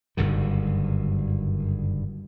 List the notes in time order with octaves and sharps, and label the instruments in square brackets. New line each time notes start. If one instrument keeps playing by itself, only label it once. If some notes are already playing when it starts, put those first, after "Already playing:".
[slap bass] F#1 G2 D3 D#3